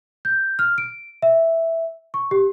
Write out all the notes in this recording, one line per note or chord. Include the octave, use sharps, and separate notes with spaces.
G6
F6
D7
E5
C#6
G4